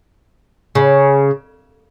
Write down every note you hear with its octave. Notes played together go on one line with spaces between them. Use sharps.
C#3